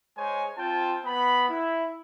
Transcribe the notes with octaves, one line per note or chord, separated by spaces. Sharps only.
G#3 C5 C#5 G#5
C4 F4 G5 A5
B3 B5
E4